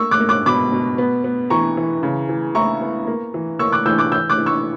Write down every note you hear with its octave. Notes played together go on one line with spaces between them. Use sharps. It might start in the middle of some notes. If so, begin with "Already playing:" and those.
Already playing: A#3 C#6 E6
D6 F#6
A#3
D6 F#6
B2 B5 D6
B2
B3
B3
E3 A#5 C#6
E3
C#3
E3
E4 A#5 C#6
B3
A#3
E3
A#3 C#6 E6
D6 F#6
E3 E6 G6
D6 F#6
E3 E6 G6
D6 F#6
E3
C#6 E6